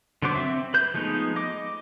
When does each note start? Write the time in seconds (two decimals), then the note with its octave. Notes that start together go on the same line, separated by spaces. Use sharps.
0.22 D3 F#3 B3 C5 D6
0.35 C4 E5
0.74 B4 G6
0.94 F3 G#3 A3 B3 D#4
1.36 D#5 D6